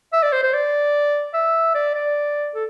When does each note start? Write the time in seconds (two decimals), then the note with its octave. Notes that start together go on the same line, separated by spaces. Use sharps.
0.13 E5
0.22 D5
0.32 C5
0.43 C5
0.53 D5
1.34 E5
1.75 D5
1.94 D5
2.55 A4